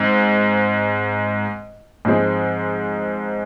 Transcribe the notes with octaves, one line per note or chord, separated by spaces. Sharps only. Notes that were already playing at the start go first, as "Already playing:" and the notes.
Already playing: G#2 C4
G#2 F3 G#3 C4